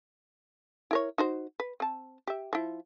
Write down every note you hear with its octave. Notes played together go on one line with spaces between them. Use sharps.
E4 A#4 C#5
D#4 F#4 C5
B4
C4 A5
G4 E5
F3 E4